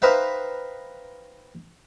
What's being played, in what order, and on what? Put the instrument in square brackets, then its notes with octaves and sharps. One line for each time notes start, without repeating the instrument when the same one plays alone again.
[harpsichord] D#4 B4 C5 E5 F5 G5